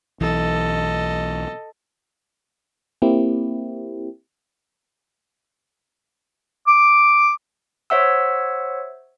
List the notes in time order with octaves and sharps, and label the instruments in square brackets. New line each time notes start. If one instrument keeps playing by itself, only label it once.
[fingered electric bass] B1 E3 [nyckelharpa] A4 D#5
[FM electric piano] A#3 C4 E4 G4
[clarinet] D6
[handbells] C5 C#5 E5 F#5 E6